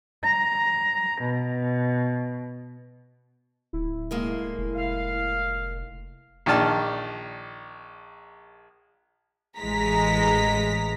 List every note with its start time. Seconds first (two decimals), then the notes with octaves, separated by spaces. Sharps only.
0.24 A#5
1.21 B2
3.73 D1 E4
4.11 A2 G#3 A#3
4.58 F1
4.75 F5
6.46 A#1 D#3 D#4 D5 A5 F6
9.59 A1 E3 G#3 A#5 B6